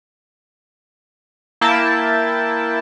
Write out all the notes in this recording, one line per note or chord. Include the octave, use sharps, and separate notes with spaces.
A#3 E4 G5 A5